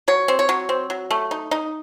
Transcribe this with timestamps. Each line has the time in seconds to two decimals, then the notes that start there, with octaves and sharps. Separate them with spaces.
0.08 F#3 C#5
0.28 C4
0.39 C#5
0.49 F#3
0.69 C4
0.90 F#3
1.11 A3
1.31 D#4
1.51 D#4